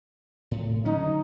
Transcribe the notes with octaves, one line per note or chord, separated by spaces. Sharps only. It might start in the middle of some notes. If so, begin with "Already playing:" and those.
A2
D3 F#3 C#4 D#4